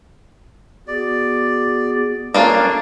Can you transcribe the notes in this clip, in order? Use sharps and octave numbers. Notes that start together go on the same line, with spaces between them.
B3 F#4 G#4 D5
A#3 C#4 D4 F4 A4 D5 A5 A#5